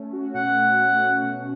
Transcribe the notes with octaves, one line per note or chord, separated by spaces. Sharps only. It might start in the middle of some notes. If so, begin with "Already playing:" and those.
Already playing: A3 C#4
F#4
B2 F#5
C#4
A3
F#4
B2